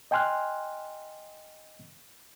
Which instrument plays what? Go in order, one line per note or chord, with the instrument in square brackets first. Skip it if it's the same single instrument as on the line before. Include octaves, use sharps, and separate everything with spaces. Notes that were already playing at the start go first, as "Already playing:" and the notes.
[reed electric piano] D#5 G5 G#5 C6 F6 F#6